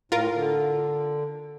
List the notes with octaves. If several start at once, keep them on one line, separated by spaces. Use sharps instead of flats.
A2 F4 A#4
D3